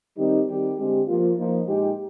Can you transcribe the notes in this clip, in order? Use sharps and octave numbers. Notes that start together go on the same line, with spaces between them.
D#3 G3 C4 D#4 G4
D#3 G3 C4 G4
D3 G#3 C4 G4
F3 A#3 F4
F3 A#3 D#4
A#2 G#3 D#4 G4